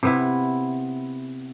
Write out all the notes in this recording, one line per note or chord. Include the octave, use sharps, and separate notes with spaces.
C3 B3 E4